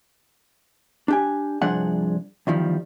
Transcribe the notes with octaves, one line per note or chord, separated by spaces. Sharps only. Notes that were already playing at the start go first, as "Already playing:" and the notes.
D4 G4 G#5
C2 G2 F3 D4 G#4 F#5
E2 D#3 F3 G3